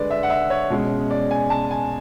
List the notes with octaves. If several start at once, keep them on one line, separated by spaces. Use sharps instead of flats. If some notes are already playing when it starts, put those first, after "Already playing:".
Already playing: D3 G#3 D4 B4 D5
E5
F#5
E5
C#5
B2 G#3 C#4
D5
G#5
A5
G#5